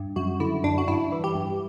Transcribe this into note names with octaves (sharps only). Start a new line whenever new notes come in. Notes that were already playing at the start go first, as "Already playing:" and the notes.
Already playing: G2
F#2 F#4
D3 E4
F#2 D4
F#4
G2 E4
E3
G4
G2